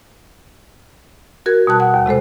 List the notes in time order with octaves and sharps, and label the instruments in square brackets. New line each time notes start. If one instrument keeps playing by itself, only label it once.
[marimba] F#4 A#4 G#6
B2 G3 A5 F#6
F#5
D#2
C3 G#3 A4 C5